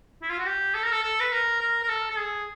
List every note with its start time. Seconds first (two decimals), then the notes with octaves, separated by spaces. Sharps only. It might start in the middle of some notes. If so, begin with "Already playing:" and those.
0.22 E4
0.30 F4
0.38 F#4
0.46 G4
0.75 A4
0.83 A#4
0.92 A4
1.03 A4
1.20 B4
1.32 A#4
1.60 A#4
1.83 A#4
1.89 A4
2.10 A4
2.18 G#4